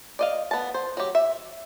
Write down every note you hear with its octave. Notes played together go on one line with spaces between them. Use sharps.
D5 D#5 F5
B3 A5
C5
F#3 G4
E5